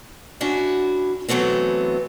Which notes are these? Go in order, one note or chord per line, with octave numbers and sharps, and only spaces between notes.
C#4 D4 E4 F#4
E3 F#3 A3 B3 C4